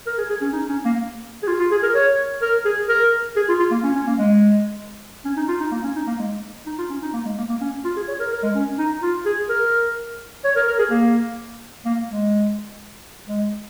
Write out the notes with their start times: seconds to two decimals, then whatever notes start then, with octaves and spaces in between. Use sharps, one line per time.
0.06 A#4
0.18 G#4
0.30 G#4
0.41 C#4
0.53 D#4
0.69 C#4
0.85 A#3
1.43 G#4
1.48 F4
1.59 F4
1.72 G#4
1.83 A#4
1.95 C#5
2.42 A#4
2.65 G#4
2.89 A#4
3.36 G#4
3.48 F4
3.60 F4
3.71 A#3
3.84 C#4
3.96 C#4
4.07 A#3
4.19 G#3
5.25 C#4
5.37 D#4
5.48 F4
5.60 D#4
5.72 A#3
5.83 C#4
5.96 D#4
6.07 A#3
6.19 G#3
6.66 D#4
6.78 F4
6.90 C#4
7.02 D#4
7.14 A#3
7.26 G#3
7.38 A#3
7.49 A#3
7.61 C#4
7.84 F4
7.96 G#4
8.08 C#5
8.20 A#4
8.32 A#4
8.43 G#3
8.55 C#4
8.78 D#4
9.02 F4
9.26 G#4
9.49 A#4
10.44 C#5
10.56 A#4
10.68 A#4
10.79 G#4
10.91 A#3
11.85 A#3
12.09 G#3
13.27 G#3